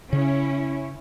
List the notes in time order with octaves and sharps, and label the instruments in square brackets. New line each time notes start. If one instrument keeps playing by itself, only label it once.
[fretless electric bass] C#3 [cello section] C#4 E4